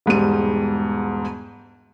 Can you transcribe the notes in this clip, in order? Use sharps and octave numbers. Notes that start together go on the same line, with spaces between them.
E1 G#2 G3 D#7